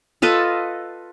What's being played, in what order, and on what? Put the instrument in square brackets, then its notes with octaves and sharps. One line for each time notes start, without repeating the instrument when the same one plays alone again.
[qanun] F4 A4 B4 D#5